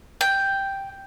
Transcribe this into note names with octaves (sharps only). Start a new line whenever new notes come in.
G5